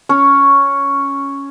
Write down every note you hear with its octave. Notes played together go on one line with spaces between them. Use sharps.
C#4